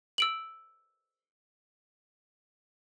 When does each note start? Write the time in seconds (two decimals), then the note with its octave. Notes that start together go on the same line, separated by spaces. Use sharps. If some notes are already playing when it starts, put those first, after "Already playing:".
0.18 E6 D7 F#7